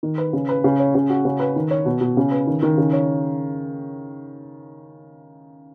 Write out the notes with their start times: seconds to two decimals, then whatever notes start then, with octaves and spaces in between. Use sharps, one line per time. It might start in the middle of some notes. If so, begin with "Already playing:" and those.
0.03 D#3
0.18 B4
0.33 C#3
0.49 B4
0.64 C#3
0.80 C#5
0.95 C#3
1.10 F#4
1.25 C#3
1.40 B4
1.56 D#3
1.71 C#5
1.85 B2
2.01 B2
2.17 C#3
2.31 B4
2.47 D#3
2.62 D#3
2.78 C#3
2.93 C#5